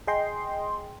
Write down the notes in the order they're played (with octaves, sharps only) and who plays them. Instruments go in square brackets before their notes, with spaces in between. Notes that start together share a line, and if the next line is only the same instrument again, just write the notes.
[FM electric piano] G#4 D#5 G5 C6